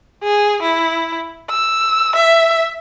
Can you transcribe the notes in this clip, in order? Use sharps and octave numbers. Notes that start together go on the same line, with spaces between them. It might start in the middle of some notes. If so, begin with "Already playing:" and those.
G#4
E4
E6
E5